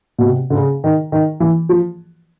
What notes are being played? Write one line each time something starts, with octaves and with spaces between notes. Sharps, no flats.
B2
C3
D3
C#3
D#3
D#3
E3
F3